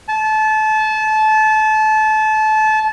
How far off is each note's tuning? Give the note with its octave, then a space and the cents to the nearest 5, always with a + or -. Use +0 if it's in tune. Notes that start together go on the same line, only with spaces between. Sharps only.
A5 -25